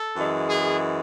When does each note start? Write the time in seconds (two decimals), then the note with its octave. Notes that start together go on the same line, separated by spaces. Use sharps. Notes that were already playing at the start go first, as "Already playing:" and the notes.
Already playing: A4
0.15 F#2 E3 G#3
0.47 G#4